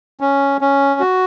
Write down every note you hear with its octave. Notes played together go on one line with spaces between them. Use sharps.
C#4
C#4
F#4